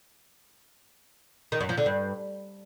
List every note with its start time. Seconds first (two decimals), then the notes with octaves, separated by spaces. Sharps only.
1.52 D#3
1.61 F#2
1.69 F3
1.77 D3
1.86 G2